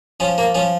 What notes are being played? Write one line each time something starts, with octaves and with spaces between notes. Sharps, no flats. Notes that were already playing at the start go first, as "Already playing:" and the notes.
F3 C#4
A#3
F3 C#4